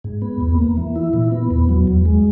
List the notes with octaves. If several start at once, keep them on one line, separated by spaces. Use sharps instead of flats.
G#2
B3
E2
A#3
E3
E4
A#2
B3
E2
F#3
E2
G#3